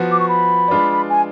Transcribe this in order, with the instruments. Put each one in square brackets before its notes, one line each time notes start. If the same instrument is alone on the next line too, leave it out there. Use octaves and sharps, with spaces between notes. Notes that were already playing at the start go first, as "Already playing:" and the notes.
Already playing: [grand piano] F3 B3 F#4
[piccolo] D6
C#6
B5
[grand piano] G#3 D4 F4 B4 D5
[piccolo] G#5